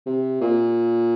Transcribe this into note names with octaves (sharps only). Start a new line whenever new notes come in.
C3
A#2